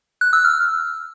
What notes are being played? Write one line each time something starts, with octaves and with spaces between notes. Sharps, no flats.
F#6
E6
F6